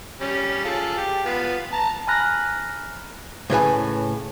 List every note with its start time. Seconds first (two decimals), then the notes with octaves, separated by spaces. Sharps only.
0.21 G3 C#4
0.65 F4 G#4 A4
0.97 G4
1.26 B3 F4
1.72 A5 A#5
2.07 G#5 A#5 B5 F6 F#6 A#6
3.50 A2 C#3 B4 G#5